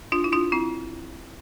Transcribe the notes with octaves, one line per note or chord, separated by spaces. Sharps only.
D4 F4
E4
D4 F4
C4 E4